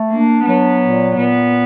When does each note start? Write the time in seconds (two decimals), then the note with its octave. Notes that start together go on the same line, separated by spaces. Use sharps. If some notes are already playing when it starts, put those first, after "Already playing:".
Already playing: A3
0.10 A#3 D4
0.45 F#3 B3
0.80 A#2
1.16 A#2 B3